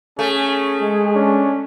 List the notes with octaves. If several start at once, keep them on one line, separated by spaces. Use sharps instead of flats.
A3 C#4 G#4
G#3
C#4 D4